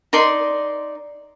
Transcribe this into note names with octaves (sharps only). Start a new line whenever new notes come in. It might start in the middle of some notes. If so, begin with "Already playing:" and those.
D#4 A#4 D5 C6